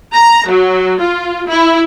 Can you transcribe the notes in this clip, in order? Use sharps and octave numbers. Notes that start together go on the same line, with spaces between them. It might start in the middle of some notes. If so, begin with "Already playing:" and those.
A#5
F#3
F4
E4